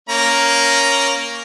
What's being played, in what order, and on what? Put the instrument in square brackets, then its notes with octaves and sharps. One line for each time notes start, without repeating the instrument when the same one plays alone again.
[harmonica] A#3 C#4 A#5